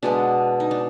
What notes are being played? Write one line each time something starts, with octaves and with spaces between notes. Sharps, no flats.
B2 G#3 B3 D4
D#4
D4